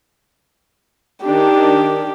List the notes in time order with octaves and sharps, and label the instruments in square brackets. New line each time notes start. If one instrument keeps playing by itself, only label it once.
[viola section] D#3 D4 [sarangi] G4